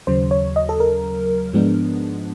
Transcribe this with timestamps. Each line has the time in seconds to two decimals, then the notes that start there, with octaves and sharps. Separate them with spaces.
0.07 D#2 C#3 F#3 C5
0.31 C#5
0.56 D#5
0.69 A4
0.80 A#4
1.53 G#2 F3 G#3 B3 D4